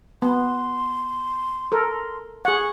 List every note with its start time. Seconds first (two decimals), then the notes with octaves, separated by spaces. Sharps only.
0.22 B3 C6
1.72 A4 A#4
2.45 G#4 F#5 C#6